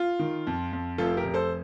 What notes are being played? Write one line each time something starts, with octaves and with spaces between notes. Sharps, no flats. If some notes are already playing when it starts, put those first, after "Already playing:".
Already playing: F4
D#3
F2
F2
F1 F4 A4
G4 A#4
F1
A4 C5